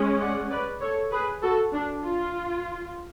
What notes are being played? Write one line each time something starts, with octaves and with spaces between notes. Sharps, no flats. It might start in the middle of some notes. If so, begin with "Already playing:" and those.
Already playing: G#3 C#4
D5 F#5
B4 D5
A4 C#5
G#4 B4
F#4 A4
D4
F4